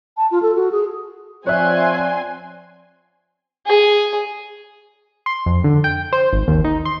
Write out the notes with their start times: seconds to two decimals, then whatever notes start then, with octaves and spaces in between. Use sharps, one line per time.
0.17 A5
0.31 F4
0.42 A4
0.55 F#4
0.72 G#4
1.47 F3 C4 C#5 D5 E5 G#5 C6 F#6
3.67 G#4
5.26 C6
5.46 F2
5.64 D3
5.84 G5
6.13 C5
6.33 G#1
6.48 D#2
6.64 D#4
6.85 C6